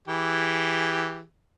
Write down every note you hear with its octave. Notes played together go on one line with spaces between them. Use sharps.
E3 G4 G#4